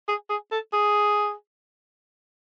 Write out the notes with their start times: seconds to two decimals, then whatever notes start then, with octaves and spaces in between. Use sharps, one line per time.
0.08 G#4
0.30 G#4
0.52 A4
0.73 G#4